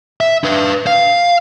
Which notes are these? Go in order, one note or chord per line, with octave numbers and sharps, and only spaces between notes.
E5
D4 B4
F5